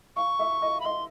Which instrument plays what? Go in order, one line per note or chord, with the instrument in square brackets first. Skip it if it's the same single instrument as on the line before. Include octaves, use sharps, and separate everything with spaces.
[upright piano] F5 [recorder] C#6
[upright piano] E5
D#5
[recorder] B5
[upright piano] D#5 [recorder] C6